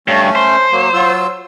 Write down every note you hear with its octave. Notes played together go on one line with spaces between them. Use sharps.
G2 A3 C#4
C5
F#3 A#3
F#3 F4 E6